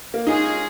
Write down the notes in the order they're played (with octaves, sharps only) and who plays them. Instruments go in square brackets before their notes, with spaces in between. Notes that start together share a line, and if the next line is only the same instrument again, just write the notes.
[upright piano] A#3
[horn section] G#3 C#4 F4 G#4 [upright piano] D#4